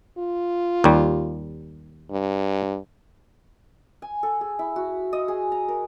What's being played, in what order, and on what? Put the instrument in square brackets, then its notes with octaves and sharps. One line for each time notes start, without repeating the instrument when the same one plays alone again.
[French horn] F4
[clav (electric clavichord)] D#2 G3
[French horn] G2
[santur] G#5
A4
G#4
E4
F#4
D#5
G#4
A#5
A#4